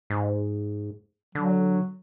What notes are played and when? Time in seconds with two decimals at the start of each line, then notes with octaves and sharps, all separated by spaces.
0.10 G#2
1.35 D3 F#3